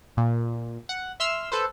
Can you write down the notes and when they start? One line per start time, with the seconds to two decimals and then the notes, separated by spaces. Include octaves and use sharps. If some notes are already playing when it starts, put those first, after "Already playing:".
0.17 A#2
0.89 F#5
1.20 E5 C6 E6 F6
1.52 A4 B4 C5